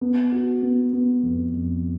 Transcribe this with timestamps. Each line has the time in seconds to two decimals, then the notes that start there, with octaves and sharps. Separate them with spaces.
0.01 B3
0.32 F#4
0.62 B3
0.93 B3
1.23 F2
1.54 F2